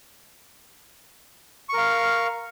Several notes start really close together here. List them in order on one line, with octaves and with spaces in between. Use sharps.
C#6 A#4 F5